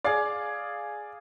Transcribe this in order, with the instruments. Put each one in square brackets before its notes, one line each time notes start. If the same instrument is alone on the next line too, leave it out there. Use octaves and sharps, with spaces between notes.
[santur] G#4 F5 [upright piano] D5